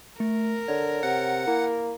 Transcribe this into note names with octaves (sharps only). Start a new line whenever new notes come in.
A3 A#4
D3 C#5
C3 F#5
A#3 E4